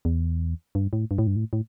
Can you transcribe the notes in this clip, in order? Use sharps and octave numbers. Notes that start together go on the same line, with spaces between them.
E2
G2
A2
G2
A2
G2
A2
A2